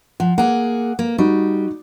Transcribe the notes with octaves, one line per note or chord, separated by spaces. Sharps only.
F3 F#5
A#3 G#4 F#5
A#3
G3 D#4 F#4